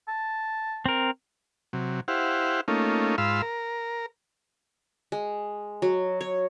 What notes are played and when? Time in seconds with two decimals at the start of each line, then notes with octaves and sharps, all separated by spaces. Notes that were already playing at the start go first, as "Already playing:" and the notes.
0.08 A5
0.86 C4 A#4
1.73 C3 F#3
2.08 E4 G4 C5 F5 F#5
2.68 A3 A#3 C#4 D#4 F4
3.18 G#2 F4 F5 B5 C6 E6
3.42 A#4
5.12 G#3
5.82 F#3
6.21 C#5